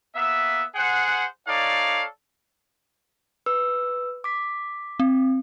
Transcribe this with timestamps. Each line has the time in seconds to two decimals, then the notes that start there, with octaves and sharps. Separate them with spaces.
0.15 A#3 B3 E5
0.75 G#4 C5 F#5
1.47 D#4 A4 C#5 D5 F5
3.46 B4 E6
4.24 D6 B6
5.00 C4